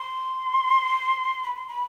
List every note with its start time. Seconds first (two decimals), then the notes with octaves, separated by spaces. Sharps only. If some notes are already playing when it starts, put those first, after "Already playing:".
Already playing: C6
1.43 B5
1.55 C6
1.68 B5